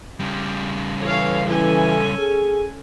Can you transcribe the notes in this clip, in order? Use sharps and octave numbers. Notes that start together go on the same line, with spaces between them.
C#3 G3
E3 A4 C#5 F5
E3 C#4 A4 G#5
G#4